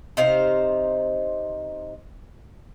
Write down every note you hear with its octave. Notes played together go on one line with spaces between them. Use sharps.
C3 D#4 C5 F5